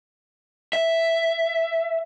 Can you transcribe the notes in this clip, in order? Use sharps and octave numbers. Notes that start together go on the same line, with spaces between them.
E5